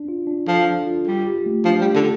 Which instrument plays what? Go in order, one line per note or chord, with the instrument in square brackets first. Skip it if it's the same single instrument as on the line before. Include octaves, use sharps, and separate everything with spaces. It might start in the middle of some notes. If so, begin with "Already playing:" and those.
Already playing: [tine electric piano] D4
F4
D4
[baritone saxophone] F3 [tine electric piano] A4
[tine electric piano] D4
F4
[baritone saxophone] G3 [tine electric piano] G4
[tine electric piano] G4
A3
[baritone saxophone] F3 [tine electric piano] D4
[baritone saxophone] G3
[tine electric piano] G4
[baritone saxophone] D3